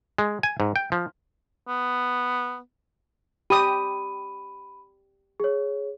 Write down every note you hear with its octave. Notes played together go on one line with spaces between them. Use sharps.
G#3
G#5
G#2
G5
F3
B3
G4 B5 D#6 D#7
G#4 C#5